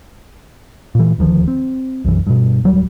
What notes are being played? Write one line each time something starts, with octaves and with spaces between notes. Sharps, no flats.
A#2 E3
D#1 D2 D#3 F3
C4
B1 F#2 E3
G2 B2
D1 F#3 G3